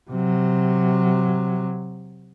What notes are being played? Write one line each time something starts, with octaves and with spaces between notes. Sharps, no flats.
C3 F#3